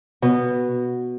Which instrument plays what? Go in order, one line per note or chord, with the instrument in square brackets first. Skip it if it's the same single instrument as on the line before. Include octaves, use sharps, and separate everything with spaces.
[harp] B2